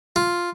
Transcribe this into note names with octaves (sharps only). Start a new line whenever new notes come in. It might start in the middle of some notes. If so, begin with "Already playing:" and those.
F4